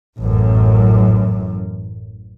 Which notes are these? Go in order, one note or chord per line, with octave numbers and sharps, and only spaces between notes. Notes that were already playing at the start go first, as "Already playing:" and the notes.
A1 F#2